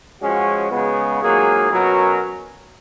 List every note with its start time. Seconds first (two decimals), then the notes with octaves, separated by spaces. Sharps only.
0.20 F3 G#3 C#4 F#4
0.70 C#3 G#3 B3
1.21 G#2 F#3 A#3 F4 G#4
1.70 B2 F#3 C#4 F#4 A#4